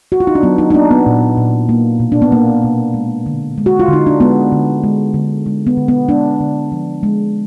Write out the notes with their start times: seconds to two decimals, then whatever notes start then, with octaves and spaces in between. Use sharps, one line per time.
0.12 F#4
0.20 F4
0.27 D#4
0.35 D4
0.43 F#3 B3
0.58 D#4
0.70 D#4
0.74 A#3 D4
0.91 B3
1.06 A#2
1.37 A#2
1.69 A#3
2.00 B2
2.12 D4
2.22 B3
2.32 A#3
2.63 B2
2.94 G#3
3.26 D3
3.58 G#3
3.66 F#4
3.80 F4
3.88 D3 D#4
4.07 D4
4.20 G#3 B3
4.52 D3
4.84 G#3
5.14 D3
5.46 G#3
5.67 B3
5.77 D3
5.88 B3
6.09 G#3 D4
6.40 D3
6.72 F3
7.03 G#3